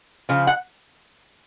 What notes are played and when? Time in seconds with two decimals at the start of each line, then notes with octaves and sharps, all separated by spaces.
0.29 C#3 F3
0.47 F#5